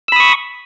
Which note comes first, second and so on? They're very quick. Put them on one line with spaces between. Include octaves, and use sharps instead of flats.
E6 B5 D#6 C#6